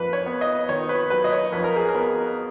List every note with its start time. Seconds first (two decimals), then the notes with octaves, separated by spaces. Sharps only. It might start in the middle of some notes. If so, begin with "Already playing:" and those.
Already playing: F2 B4
0.13 C#5
0.26 B3
0.41 D#5
0.69 D#3 C#5
0.89 B4
1.10 F#3 B4
1.24 D#5
1.32 C#5
1.52 F2 B4
1.64 A#4
1.76 G#4
1.89 A#4
1.95 B3